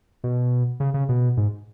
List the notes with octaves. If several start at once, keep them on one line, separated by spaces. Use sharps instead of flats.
B2
C#3
C#3
B2
G#2